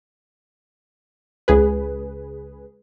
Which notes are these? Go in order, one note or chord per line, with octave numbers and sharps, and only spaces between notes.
C#2 G#4 B4